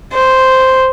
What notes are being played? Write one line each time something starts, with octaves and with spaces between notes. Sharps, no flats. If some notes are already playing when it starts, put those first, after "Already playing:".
C5